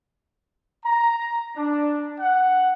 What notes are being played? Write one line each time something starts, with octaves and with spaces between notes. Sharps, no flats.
A#5
D4
F#5